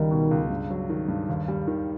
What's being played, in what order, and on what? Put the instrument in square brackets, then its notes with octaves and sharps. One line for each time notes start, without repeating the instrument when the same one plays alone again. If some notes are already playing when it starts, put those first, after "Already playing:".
Already playing: [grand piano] C#2 G3 [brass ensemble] D#3
[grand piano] B2
C#2
G2
F#3
D#3
G2
D#2
G3
D#3